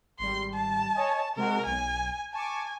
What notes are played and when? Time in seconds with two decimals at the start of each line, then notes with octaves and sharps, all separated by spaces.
0.19 G#1 G3 C6
0.53 A5
0.93 C#5 D#5 G#5
1.36 C3 G#3 F#4 A#4
1.66 B1 G#5
2.33 G#5 A5 C#6 D6